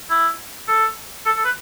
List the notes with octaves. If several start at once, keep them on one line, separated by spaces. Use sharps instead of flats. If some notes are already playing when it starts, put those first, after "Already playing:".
E4
A4
A4
A4
B4